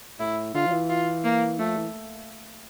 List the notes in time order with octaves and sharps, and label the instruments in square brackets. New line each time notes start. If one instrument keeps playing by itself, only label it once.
[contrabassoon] A2 [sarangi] E4
[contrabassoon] D3 [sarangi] F4
[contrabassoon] F3
E3
[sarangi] F4
A#3
[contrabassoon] F3 [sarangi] A3
[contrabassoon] E3